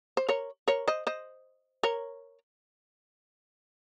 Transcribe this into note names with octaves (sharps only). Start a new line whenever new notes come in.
C5
A#4 C#5
A#4 C#5
C5 D#5
C5 D#5
A#4 C#5